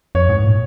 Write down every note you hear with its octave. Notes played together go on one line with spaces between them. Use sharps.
F2 C#5
G#2
A#2